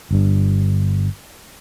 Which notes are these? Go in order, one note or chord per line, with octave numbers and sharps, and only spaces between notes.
G1 G2